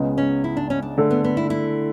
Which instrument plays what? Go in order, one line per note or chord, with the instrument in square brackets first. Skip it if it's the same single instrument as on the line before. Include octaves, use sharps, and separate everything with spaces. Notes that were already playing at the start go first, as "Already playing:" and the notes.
Already playing: [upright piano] C#2 C#3 G#3 B3
[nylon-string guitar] C#4
E4
D4
C#4
D4
[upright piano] D3 A3 D4 A4
[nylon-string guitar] B3
B3
E4
E4